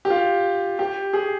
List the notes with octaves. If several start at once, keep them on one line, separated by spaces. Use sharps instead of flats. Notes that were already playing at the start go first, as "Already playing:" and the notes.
G4
F4
G4
G#4